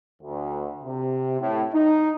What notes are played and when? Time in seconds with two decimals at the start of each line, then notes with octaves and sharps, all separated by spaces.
0.22 D2
0.83 C3
1.41 A2
1.73 D#4